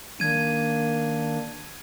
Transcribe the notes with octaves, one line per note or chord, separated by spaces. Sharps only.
D#3 A#3 D4 G#6 D#7